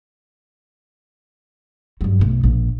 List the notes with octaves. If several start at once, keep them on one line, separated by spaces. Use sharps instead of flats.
G2 F#3
B1 A3
A#1